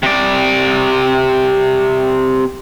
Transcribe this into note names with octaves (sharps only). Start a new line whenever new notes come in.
C3 D5